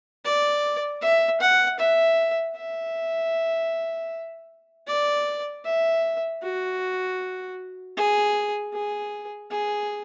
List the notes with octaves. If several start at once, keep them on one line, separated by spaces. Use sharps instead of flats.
D5
E5
F#5
E5
E5
D5
E5
F#4
G#4
G#4
G#4